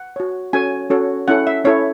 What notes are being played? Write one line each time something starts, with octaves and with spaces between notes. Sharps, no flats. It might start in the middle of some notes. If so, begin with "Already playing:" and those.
Already playing: F#5
F#4 C#5
C#4 F#4 A4 C#5 G#5
C#4 F#4 A4 C#5
C#4 E4 A4 F#5
E5
C#4 E4 A4 C#5